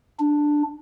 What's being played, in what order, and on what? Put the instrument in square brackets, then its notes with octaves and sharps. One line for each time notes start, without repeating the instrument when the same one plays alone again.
[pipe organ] D4